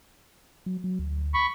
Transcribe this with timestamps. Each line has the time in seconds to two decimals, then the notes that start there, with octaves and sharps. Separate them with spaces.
0.66 F#3
0.84 F#3
0.99 D2
1.34 B5 C#6